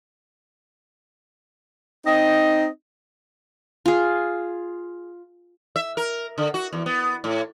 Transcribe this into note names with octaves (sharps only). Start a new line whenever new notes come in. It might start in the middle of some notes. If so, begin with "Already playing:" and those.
C4 D#4 D#5
F4 G#4
E5
A#4
D3
F#4
E2
B3
A2